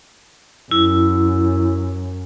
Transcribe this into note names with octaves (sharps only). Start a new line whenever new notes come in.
F#2 E4